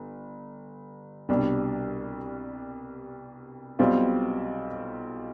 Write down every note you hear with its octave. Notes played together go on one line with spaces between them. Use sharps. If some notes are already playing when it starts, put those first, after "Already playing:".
Already playing: G1
C2 B2 G3 D4
B1 B2 G3 C4 F4